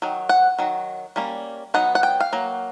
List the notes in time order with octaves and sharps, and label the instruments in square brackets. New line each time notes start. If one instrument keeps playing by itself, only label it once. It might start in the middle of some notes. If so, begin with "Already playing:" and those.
[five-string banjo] D#3 F#3
F#5
D#3 F#3
G3 A#3 C#4
F#3 B3 D#4 F#5
F#5
G5
F5
F#3 A#3